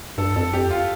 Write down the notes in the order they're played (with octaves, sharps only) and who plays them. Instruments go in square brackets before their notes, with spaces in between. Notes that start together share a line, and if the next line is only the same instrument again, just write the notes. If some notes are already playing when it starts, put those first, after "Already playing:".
[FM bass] G2 [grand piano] A4
[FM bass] F2 [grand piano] A4
[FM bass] F2 [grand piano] G4
[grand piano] F4